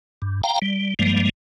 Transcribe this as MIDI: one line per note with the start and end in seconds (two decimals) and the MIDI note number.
0.22 0.42 43
0.44 0.59 77
0.44 0.59 79
0.44 0.59 82
0.62 0.94 55
0.99 1.29 43
0.99 1.29 53
0.99 1.29 55
0.99 1.29 56
0.99 1.29 58